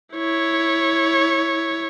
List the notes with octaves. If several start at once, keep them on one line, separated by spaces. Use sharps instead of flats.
E4 C#5